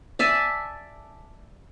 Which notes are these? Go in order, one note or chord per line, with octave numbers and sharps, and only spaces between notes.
D5 E5 G#5 A5